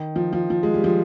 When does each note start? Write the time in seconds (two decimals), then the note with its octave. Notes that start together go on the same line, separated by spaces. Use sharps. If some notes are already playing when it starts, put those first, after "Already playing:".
Already playing: D#3
0.16 F3
0.33 F3
0.50 F3
0.63 G#3
0.74 G3
0.84 F3